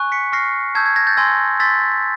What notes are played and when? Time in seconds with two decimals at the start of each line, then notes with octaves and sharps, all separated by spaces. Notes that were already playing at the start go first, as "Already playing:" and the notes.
Already playing: G#5 C#6 F#6
0.12 B6 C#7
0.32 C#6 F6 A#6 C7
0.75 A5 C#6 E6 G6 G#6
0.86 G#6
0.96 G#6 A#6
1.07 G6 A6
1.17 G#5 C6 E6 G#6 A#6
1.60 C6 E6 G6 A6 B6